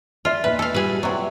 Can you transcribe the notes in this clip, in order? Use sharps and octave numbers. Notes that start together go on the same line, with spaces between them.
F4 D5 E5
E2 A#2 D#4 B4
A4 F5
G3 F4 F#4 G#4 B4
C3 F#3 D5 E5 G5